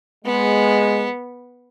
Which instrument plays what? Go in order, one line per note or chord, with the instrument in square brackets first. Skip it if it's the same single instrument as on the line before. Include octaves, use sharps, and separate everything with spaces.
[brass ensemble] G#3 [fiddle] B3